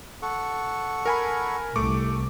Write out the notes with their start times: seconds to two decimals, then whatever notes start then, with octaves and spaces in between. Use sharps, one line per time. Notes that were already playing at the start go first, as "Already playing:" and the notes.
0.22 A4 F#5 C#6
1.06 A#4 G#5 B5
1.76 C2 A3 C#6 D6